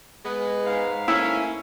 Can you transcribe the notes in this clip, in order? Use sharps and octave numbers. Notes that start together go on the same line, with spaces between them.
G#3 B3
G#2 F5
A3 A#3 C#4 E4